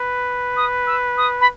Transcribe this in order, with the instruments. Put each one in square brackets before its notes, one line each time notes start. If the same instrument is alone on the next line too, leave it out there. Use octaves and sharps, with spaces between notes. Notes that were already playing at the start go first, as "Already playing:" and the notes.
Already playing: [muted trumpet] B4
[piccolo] D#6
E6
D#6
B5